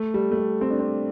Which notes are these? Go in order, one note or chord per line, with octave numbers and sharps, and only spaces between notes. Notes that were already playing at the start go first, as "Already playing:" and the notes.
Already playing: A3
G3
A3
G3
C4
D4
C4